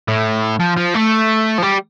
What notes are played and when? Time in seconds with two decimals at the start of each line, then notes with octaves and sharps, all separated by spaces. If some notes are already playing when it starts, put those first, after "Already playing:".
0.08 A2
0.60 F3
0.77 F3
0.94 A3
1.58 F3
1.62 G3